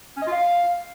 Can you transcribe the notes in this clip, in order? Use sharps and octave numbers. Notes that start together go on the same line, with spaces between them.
C#4
D#5
F4
F5